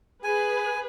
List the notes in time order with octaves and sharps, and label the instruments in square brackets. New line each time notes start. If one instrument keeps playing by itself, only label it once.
[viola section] G#4 B4 [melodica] G#5